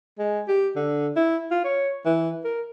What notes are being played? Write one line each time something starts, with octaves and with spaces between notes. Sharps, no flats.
G#3
G4
D3
E4
F4
C#5
E3
A#4